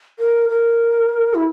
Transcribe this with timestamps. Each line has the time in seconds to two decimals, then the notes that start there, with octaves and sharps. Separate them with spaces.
0.19 A#4
0.49 A#4
1.34 E4